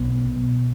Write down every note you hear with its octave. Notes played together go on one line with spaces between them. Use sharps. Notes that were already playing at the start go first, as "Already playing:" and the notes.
Already playing: B1 B3
B2